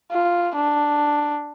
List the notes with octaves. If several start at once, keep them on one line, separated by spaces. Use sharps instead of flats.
F4
D4